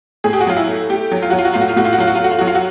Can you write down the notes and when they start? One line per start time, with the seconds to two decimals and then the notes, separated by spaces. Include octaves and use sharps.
0.24 A2 G#4
0.33 G4
0.41 F#4
0.47 F#3 F4
0.57 E4
0.68 A3
0.89 A3 G4
1.12 F#3
1.22 F4
1.30 F#3 F#4
1.38 F4
1.45 F#4
1.54 A2 F4
1.61 F#4
1.69 F4
1.76 A2 F#4
1.85 F4
1.93 F#4
1.98 F#3 F4
2.07 F#4
2.15 F4
2.20 A3 F#4
2.31 F4
2.39 F#3 F#4
2.47 F4
2.55 F#4